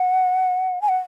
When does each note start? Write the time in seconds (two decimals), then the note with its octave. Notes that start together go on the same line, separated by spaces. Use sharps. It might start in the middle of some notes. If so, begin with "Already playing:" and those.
Already playing: F#5
0.82 G#5
0.89 F#5